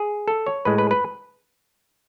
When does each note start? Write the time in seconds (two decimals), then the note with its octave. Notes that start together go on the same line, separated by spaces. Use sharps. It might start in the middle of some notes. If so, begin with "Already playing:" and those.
Already playing: G#4
0.28 A4
0.47 C#5
0.65 A2 G#3 B4
0.78 B4
0.91 B4